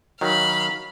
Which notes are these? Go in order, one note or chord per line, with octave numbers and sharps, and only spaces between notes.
D#3 F#3 F5 B5